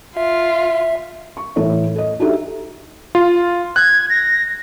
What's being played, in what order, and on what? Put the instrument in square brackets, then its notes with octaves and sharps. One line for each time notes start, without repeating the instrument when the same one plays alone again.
[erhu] F4 [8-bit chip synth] E5
[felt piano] C#6
A2 E3 A4 C#5
A4 D#5
D4 D#4 F#4 G4 A4 E5
[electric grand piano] F4
[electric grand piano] F#6 [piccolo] G#6
[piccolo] A#6